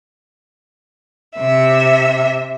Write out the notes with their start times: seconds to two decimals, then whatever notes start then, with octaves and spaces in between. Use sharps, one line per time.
1.37 C3 E5